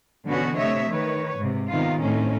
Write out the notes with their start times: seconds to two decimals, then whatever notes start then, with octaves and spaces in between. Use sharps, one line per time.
0.24 B2 D3 E3 B3 C#4 F#4
0.57 C3 A3 C#5 D#5 E5
0.91 D#3 B4 C#5
1.38 G#2 C3
1.68 C3 D#3 B3 D#4 F4
2.00 A2 C4 C#4 D#4